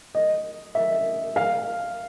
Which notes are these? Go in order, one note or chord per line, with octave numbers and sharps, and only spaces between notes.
D#5
E5
F5